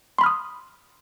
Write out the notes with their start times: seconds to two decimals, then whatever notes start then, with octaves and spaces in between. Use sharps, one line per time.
0.18 C6
0.21 B5
0.24 F6
0.26 D#6